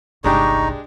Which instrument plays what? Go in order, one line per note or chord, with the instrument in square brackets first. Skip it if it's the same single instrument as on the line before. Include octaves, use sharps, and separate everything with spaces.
[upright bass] G1 C2 [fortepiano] G#3 D4 G4 [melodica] D#4 [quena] C#6